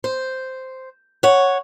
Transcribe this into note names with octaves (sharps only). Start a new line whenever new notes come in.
C5
C#5 F#5